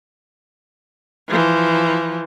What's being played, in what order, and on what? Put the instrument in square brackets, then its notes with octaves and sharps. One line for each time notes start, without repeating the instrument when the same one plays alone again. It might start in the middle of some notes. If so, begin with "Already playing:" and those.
[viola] E3 F3